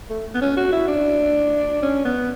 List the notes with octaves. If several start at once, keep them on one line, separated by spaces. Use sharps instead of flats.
A3
B3
C#4
F#4
E4
D4
C#4
B3